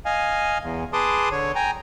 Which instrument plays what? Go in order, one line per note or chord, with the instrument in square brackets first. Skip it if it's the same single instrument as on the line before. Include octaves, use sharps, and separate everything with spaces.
[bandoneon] D#5 F5 G#5
E2
G#4 B4 A5 C6 D6 D#6
D3 C#5
G5 G#5 A#5